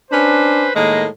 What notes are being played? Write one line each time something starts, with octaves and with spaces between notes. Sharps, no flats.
C#4 D4 B4 C5
A2 D#3 G#3 A#3 D#5